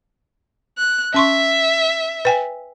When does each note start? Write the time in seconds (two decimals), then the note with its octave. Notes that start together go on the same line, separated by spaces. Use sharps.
0.78 F#6
1.14 C#4 E5 C6 C#6
2.25 B4 G5 G#5